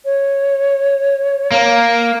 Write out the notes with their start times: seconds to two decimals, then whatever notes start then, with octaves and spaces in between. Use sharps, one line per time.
0.05 C#5
1.51 A#3